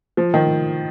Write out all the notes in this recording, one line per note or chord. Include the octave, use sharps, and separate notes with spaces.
F3
D#3